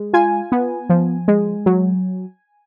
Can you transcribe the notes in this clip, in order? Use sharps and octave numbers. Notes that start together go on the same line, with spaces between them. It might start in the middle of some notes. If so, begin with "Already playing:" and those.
Already playing: G#3
F4 G#5
B3
F3
G#3
F#3